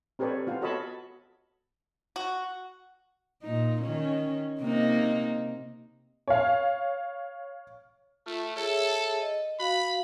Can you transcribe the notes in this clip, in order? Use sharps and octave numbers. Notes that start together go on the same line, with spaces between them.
C4 G4 A4 B4 C#5 D5
B3 F4 F5
F#4 A4 C#5 D#5 A5 B5
F#4
A#2 D#4
D#3 C#4
C3 A#3 D#4
C#5 F5
A3 F4
G#4 A4 C#5 E5
D#5
F#4 F5 B5